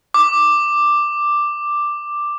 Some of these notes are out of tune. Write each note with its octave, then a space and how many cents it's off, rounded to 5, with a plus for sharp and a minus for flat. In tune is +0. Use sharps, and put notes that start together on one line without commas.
D6 +5